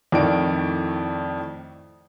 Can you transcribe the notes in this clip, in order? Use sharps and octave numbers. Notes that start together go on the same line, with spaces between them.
F2 A2 D#3 D5 D7